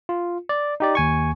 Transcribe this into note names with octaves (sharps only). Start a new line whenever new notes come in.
F4
D5
D#4 G4 D5
D#2 G#5 C#6